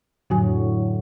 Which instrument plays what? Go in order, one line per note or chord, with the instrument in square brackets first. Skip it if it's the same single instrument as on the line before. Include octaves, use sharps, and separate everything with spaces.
[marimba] F2 F#4 G#5 [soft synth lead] A2 [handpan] D3 F#3